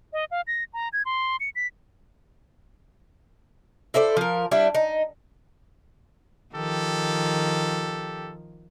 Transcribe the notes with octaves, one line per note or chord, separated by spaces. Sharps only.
D#5
F5
A#6
A#5
G#6
C6
C#7
B6
E4 A4 C5 D5
F3 A#4
G3 D4 E4
D#4
D#3 F3 G4 A4